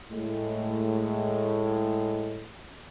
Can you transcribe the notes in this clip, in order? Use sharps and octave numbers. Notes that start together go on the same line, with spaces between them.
A2 G#3